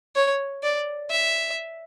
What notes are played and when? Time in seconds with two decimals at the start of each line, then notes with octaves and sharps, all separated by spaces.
0.16 C#5
0.63 D5
1.10 E5